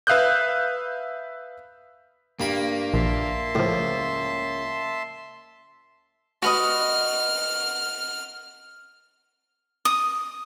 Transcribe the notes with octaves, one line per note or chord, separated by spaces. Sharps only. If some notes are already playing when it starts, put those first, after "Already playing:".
B4 E5 F5 D#6 F#6 G6
G2 A#3 B5
A#1 E5 A5 C6
C#2 A2 F3
F#4 B4 D#5 F6
D#6